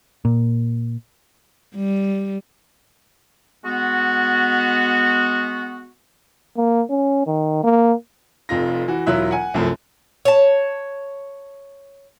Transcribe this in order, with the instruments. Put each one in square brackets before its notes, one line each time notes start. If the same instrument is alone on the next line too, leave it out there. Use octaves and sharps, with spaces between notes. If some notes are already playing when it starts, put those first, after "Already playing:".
[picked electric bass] A#2
[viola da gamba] G3
[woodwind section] G#3 B3 F#4
[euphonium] A#3
C#4
D#3
A#3
[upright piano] F1 F2 F4 A#6
E3 F#4
E1 F#3 E4 F4 E5 F#6
F#5 G#5
C2 F#2 F3 A3
[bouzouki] C#5 A5